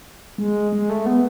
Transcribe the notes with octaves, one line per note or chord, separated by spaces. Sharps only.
G#3
G#3
A3
B3